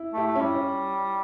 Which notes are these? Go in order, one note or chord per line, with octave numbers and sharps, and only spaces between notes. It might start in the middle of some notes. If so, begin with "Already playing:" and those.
Already playing: E4
A3 E4 G4
A3
C#4 E4
G3
C#4